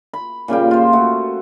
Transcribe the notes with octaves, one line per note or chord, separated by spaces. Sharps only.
B5
A#2 C#3 G3 G5
F4 C5
A3 F#4